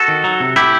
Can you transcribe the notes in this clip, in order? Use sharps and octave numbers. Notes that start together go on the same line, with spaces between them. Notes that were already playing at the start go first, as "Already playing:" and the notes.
Already playing: F#4 A4
D#3
F#3
C3
A2 E4 G4